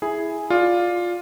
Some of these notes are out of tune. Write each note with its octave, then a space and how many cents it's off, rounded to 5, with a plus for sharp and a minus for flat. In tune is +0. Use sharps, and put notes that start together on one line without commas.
E4 +0 G#4 +0
F4 +10 D5 +0